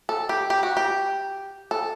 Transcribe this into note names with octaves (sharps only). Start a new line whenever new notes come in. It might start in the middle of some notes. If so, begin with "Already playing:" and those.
A4
G4
G4
F#4
G4
A4